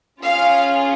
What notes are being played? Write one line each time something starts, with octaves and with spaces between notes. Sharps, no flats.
C#4 F4 G#4 F5